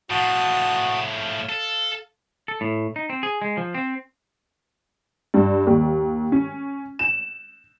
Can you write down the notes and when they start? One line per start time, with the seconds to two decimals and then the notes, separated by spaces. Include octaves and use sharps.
0.10 A2 F3 F#4 A5 D#6
1.16 F5
1.49 A4
2.48 A4
2.61 A2
2.96 D#4
3.10 C4
3.23 G#4
3.42 G#3
3.57 F3
3.75 C4
5.34 G2
5.67 D#2
6.32 C#4
6.99 E7